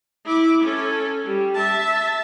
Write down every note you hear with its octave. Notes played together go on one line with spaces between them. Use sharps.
E4 D6
C#4 A4
G3
E5 A5